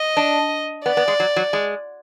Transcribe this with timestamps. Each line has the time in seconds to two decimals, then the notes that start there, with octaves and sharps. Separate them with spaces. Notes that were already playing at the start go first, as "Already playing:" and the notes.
Already playing: D#5
0.17 D4
0.85 B3 D5
0.97 B3
1.08 G#3
1.20 F#3
1.36 F#3
1.53 G#3